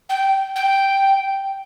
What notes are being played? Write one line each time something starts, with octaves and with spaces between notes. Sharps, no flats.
G5
G5